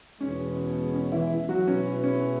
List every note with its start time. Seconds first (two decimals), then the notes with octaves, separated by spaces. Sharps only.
0.20 E2 B2 G#3 C#4
0.94 C#4
1.12 E3 E4
1.49 F#3 F#4
1.67 B2 G#3 B3 C#4 E4 B4
2.04 C#4